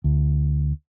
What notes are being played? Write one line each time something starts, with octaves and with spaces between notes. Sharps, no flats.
D2